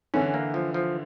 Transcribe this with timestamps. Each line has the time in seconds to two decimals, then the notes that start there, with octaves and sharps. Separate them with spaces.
0.14 D3 E3 C#4
0.34 A#3
0.54 F3
0.74 F3